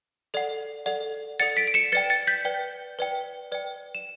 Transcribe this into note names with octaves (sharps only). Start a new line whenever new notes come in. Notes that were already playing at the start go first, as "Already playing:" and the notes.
A4 D5 F#5
A4 D5 F#5
A4 D5 F#5 A6 C#7
B6 D7
D7
C#7 E7
B4 D5 G5 A6 C#7
A6 C#7
G6 B6
B4 D5 G5
B4 D5 G5
B4 D5 G5
E7